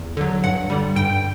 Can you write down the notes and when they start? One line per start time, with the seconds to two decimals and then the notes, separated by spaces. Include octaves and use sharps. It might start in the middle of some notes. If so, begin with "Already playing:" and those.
Already playing: E2
0.17 D3 F#3
0.44 G2 F#5
0.70 D3 G3
0.96 G2 G5